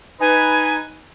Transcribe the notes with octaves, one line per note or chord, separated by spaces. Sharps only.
D#4 B4 G#5